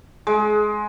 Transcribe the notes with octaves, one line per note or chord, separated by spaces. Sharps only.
G#3